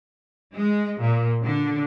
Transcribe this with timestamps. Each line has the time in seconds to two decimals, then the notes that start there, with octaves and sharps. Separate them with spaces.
0.55 G#3
1.00 A#2
1.43 D3